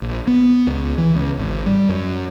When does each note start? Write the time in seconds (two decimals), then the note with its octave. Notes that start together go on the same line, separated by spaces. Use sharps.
0.02 A#1
0.27 B3
0.67 C#2
0.98 E3
1.15 C#2
1.38 G#1
1.66 G3
1.89 F#2